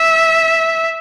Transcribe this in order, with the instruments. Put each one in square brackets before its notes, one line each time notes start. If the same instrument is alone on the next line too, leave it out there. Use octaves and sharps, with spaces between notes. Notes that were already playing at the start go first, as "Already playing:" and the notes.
Already playing: [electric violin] E5